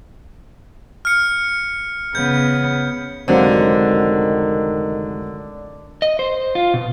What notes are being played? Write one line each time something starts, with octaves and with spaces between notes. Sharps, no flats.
F6 C#7
C#3 B3 G6
F1 D3 D#3 F#3 G#3 C4 F5
D#5
C5
F4
B2